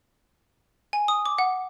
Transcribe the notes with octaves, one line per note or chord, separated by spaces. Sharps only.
G#5
D#6
D6
F#5